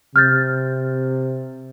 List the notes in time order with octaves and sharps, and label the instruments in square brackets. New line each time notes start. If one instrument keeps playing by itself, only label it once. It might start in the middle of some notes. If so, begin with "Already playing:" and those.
[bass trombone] C3 [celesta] F6 G6 A6